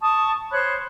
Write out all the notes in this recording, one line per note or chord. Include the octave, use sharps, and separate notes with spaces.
A5 C#6 D#6
C5 C#5 B5 F#6